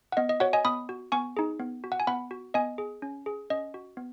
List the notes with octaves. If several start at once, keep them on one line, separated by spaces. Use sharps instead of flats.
F#5
B3 D#5
D#5
F#4 C#5 F#5
D#5 G#5
B3 B5 D#6
F#4
B3 G#5 C#6
D#4 G#4
B3
F#4
F#5
G#5
B3 F#5 B5
F#4
B3 D#5 G#5
G#4
C#4
G#4
C#4 D#5
F#4
B3